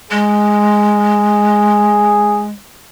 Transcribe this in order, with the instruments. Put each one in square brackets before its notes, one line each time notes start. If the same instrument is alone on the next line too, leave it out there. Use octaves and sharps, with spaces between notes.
[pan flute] G#3 [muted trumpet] G#4